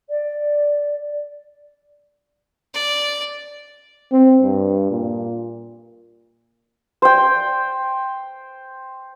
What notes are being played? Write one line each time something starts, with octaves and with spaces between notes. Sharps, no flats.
D5
D5
C4
G2
A#2
C5 G5